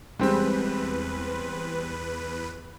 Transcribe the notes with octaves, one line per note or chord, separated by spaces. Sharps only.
E2 G3 G#3 C4 B4